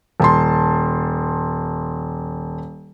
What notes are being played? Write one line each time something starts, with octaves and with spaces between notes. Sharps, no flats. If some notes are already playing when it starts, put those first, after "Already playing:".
D#1 A5 C6